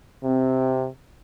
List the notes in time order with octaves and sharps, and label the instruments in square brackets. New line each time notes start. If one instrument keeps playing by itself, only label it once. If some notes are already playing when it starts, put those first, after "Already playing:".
[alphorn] C3 [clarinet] C4